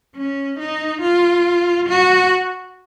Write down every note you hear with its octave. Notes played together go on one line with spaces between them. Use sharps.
C#4
D#4
F4
F#4